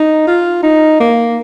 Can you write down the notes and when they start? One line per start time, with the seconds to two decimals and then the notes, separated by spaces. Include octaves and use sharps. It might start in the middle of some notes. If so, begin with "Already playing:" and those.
Already playing: D#4
0.27 F4
0.63 D#4
1.00 A#3